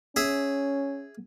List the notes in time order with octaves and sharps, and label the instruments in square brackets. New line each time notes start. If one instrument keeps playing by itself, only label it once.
[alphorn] C#4 [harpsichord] G#4 E5